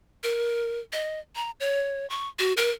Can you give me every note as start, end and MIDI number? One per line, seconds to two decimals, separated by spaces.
0.24 0.79 70
0.93 1.19 75
1.35 1.51 82
1.60 2.08 73
2.10 2.28 85
2.39 2.53 66
2.57 2.70 70